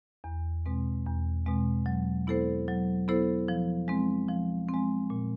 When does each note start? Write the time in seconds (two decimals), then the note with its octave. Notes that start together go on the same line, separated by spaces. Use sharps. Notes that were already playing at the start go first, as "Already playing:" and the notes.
0.24 E2
0.66 B2 G#3 C4
1.06 E2
1.46 B2 G#3 C4
1.86 F#3
2.27 B3 E4 A4 C5
2.68 F#3
3.08 B3 E4 A4 C5
3.48 F3
3.88 G#3 C4
4.29 F3
4.69 C4
4.74 G#3
5.10 A#2